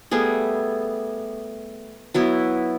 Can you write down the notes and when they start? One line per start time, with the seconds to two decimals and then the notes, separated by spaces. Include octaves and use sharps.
0.11 G3 A3 B3 G#4
2.14 F#3 B3 E4